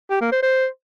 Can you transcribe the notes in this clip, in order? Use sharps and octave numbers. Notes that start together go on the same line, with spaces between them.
G4
A#3
C5
C5